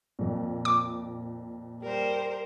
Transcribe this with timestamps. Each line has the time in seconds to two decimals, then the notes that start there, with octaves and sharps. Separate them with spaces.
0.19 F2 A#2
0.65 D6
1.83 G3 A#4 C5